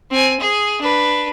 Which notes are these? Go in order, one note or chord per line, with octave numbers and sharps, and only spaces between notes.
C4 G#5
G#4
D4 B4